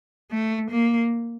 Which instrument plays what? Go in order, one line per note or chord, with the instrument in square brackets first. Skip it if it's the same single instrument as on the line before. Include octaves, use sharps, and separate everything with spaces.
[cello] A3
A#3